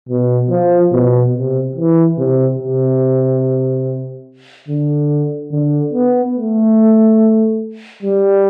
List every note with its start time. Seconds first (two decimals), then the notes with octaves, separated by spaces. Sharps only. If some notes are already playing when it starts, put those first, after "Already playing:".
0.09 B2
0.50 F3
0.93 B2
1.34 C3
1.76 E3
2.18 C3
2.60 C3
4.68 D3
5.52 D3
5.93 B3
6.36 A3
8.03 G3